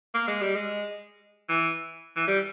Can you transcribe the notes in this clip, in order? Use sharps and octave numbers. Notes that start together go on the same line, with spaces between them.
A#3
G#3
G3
G#3
E3
E3
G3